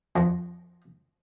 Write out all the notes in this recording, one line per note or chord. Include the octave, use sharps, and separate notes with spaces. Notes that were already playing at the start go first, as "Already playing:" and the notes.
F2